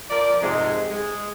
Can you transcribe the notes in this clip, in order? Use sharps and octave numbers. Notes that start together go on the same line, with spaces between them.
F3 A#4 D5
F2 G#2 C3 G#3
G#3